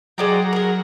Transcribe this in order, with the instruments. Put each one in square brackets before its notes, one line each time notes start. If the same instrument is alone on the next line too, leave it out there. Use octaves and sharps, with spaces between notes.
[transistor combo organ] F#3 A#5 [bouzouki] G#3 D5 G5
[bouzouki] G#4 A#4